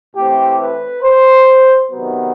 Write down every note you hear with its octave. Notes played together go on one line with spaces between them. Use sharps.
A2 E3 A3 C4 G4
B4
C5
C3 D#3 F#3 B3